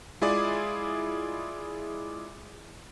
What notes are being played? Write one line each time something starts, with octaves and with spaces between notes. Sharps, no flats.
G#3 E4 F4 G#4 D5